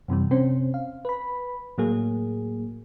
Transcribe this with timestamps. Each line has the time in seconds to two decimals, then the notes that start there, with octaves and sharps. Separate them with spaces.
0.08 F#2 C3 E3 G3
0.31 C3 C4 C#4 C5
0.74 F5
1.05 B4 B5
1.78 A2 F#3 A#3 G#4